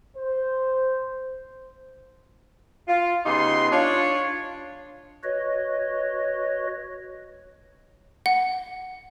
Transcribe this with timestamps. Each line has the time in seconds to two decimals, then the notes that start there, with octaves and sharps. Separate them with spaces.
0.17 C5
2.88 F4
3.26 C#3 B3 D#4 G4 C6
3.72 D4 F4 C#5
5.23 F#4 B4 C#5 D#5
8.26 F#5